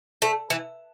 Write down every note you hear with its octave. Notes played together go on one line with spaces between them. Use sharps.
A3
E3